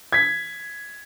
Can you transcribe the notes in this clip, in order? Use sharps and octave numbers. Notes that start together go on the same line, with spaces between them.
G#6 B6